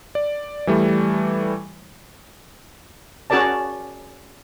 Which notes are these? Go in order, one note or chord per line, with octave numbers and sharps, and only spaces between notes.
D5
E3 G3 A3
C#4 F#4 G#4 A#4 D5 A5